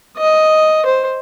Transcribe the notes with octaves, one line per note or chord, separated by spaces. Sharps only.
D#5
C5